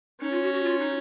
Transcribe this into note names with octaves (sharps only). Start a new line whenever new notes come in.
C#4 D#4
F4
F#4
F#4
F4
D#4